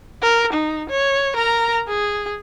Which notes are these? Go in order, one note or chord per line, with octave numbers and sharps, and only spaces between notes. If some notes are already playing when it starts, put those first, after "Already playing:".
A#4
D#4
C#5
A#4 A#5
G#4